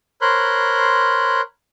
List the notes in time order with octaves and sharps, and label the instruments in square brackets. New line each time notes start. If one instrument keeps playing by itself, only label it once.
[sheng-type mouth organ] A#4 C5 C#5 B5 C6 F#6